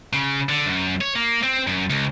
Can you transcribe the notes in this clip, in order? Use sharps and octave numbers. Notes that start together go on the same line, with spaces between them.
C#3
D3
F#2
C#5
A#3
C4
F#2
C#2